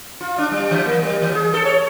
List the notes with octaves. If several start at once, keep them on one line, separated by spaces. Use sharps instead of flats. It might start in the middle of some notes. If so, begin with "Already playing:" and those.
F4
D4
G3
E3
A#3
G3
E3
G#4
A4
C#5